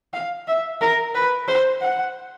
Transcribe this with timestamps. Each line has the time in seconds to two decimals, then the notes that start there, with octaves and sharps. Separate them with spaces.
0.14 F5
0.48 E5
0.81 A#4
1.15 B4
1.48 C5
1.81 F#5